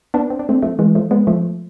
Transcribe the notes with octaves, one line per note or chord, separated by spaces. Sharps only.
B3 D4
C4
D4
A3 C4
F3 A3
E3 G#3
F3 A3
G#3 B3
F3 A3